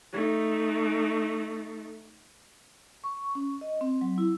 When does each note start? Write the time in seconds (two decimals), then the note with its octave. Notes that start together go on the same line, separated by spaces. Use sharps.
0.13 A3 D#4
3.04 C#6
3.35 C#4
3.61 D#5
3.81 C4
4.01 F#3
4.18 E4